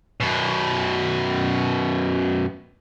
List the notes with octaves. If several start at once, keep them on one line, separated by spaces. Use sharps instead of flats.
F#2 B2